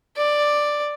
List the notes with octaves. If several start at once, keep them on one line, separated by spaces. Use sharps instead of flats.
D5